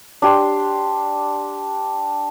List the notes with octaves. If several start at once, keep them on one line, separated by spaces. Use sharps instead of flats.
D4 G4 C6